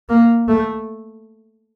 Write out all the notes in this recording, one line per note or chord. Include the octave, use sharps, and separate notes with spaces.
A#3
A3